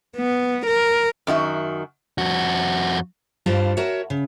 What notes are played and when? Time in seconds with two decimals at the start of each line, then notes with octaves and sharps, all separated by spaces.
0.17 B3
0.67 A#4
1.27 F#2 D#3 F#4 E5
2.18 F2 F#4
3.46 G2 G3 F4 C5 A5
3.77 F#4 A#4 C#5 E5
4.10 C#3